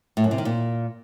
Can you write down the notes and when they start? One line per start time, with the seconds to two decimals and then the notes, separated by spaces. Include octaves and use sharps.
0.17 A2
0.24 F#2
0.31 C3
0.38 D#3
0.45 A#2